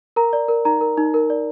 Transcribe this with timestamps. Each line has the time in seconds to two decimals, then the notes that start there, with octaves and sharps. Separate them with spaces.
0.16 A#4 A#5
0.33 D5
0.48 A#4
0.65 D#4 A#5
0.81 A#4
0.98 D#4
1.14 A#4
1.30 D5